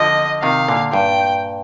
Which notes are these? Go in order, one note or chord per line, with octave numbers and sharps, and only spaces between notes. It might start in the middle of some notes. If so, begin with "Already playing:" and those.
Already playing: D3 F3 D#5
C3 D#3 F5
A#2 D3
G2 A#2 G5